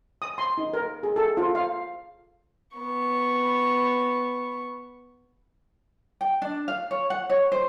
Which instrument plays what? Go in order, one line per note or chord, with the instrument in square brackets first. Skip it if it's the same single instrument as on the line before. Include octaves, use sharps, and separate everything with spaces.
[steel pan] D#6
C6
D#4
A#4
G#4
A4
F4
F5
[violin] B3 C#6
[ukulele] G5
D4
F5
C#5
F#5
C#5
C5